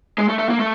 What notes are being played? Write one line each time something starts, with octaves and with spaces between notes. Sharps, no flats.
G#3
A3
A3
A#3
A3